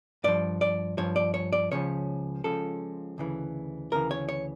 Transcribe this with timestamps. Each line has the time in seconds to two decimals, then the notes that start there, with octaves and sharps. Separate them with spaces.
0.24 G2 F3 D5
0.61 D5
0.98 G2 F3 C#5
1.16 D5
1.34 C#5
1.53 D5
1.71 C#2 C#3 F3 C#5
2.44 C#2 C#3 F3 A4
3.18 D2 C#3 E3
3.92 D2 C#3 E3 A#4
4.11 C#5
4.29 C#5